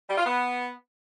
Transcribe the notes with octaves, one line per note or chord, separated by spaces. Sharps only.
G3
F4
B3